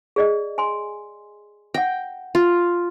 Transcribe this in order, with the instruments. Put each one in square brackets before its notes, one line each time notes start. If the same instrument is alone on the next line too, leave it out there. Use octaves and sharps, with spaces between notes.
[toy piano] G#4 D5 D#5
G#5 C6
[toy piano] E5 F#5 [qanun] G5
[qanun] F4